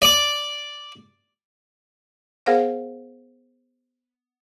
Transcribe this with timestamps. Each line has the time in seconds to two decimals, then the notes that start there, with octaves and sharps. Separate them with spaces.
0.02 D5 D6
2.46 B3 G#4 A#4 C5 F5 F#5